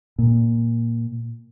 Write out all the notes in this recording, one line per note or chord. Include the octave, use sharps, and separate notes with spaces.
A#2